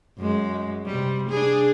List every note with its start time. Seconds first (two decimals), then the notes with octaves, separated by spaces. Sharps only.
0.19 F#2 G#3
0.86 C3 G3
1.29 D4 G#4